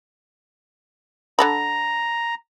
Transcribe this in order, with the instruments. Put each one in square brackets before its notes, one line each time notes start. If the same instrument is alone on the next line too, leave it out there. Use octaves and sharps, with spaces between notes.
[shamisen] D3 A4 B5 [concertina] A#5